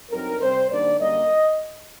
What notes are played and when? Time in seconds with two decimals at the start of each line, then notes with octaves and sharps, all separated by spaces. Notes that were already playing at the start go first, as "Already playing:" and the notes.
0.11 G2 F#3 C4 D#4 A#4
0.40 C3 G3 C4 C5
0.69 F#2 D#3 G3 A#3 D4 D5
0.98 F#2 D3 G3 A#3 D#5